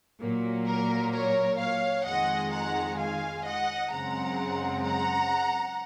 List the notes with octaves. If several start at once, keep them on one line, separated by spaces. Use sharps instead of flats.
A#2 F#3 A#3
A#4
A#4 C#5
C#5 F5
F2 D#3 G#3 D#5 F#5
F#5 A#5
F5 G#5
D#5 F#5
F#2 C#3 G#3 C4 F#5 A#5
F#5 A#5